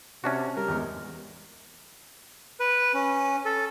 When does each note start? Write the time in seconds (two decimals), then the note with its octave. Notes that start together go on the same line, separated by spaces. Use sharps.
0.24 C3 C#4 D4 F#4
0.56 G3 A#4
0.68 E2 G#3
2.60 B4
2.94 C#4
3.45 A4